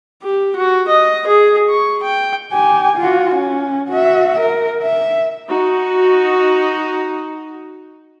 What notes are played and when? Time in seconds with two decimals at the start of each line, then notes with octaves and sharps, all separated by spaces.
0.23 G4
0.56 F#4
0.88 D#5
1.27 G#4
1.69 C#6
2.03 G5
2.52 G4 G#5
2.97 F4 F#4
3.35 C#4
3.88 F#4 E5
4.39 A#4
4.82 E5
5.47 D#4 F#4